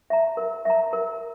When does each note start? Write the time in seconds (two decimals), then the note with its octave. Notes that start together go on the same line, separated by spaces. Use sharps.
0.10 E5 A#5
0.37 A#4
0.65 E5 A#5
0.93 A#4